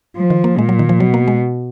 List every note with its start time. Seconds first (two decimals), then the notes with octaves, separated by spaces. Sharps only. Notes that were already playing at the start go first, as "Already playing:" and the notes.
0.17 F3
0.30 D#3
0.44 A#3
0.58 A#2 G#3
0.69 F#3
0.79 D#3
0.89 F3
1.00 B2 F#3
1.14 A#3
1.28 G#3